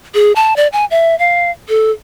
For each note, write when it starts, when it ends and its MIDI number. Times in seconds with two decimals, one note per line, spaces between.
0.14 0.32 68
0.36 0.56 81
0.56 0.68 74
0.73 0.85 80
0.91 1.18 76
1.19 1.51 77
1.69 1.91 69